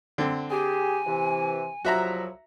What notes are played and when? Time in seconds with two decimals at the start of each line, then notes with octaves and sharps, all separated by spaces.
0.18 D3 C4
0.51 G4 G#4 G#5
1.06 C3 E3
1.85 C2 F3 F#3 F#4 E5 A#5